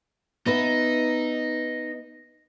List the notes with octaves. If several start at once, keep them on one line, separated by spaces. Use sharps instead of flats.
B3 D#4 B4 E5